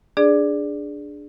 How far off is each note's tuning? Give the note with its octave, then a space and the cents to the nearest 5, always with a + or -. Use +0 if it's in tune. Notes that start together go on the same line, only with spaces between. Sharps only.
D4 +0 G#4 +0 D5 +0